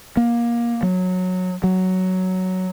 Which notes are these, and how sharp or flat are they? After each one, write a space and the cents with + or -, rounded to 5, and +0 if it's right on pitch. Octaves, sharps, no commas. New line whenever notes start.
A#3 +20
F#3 -15
F#3 +5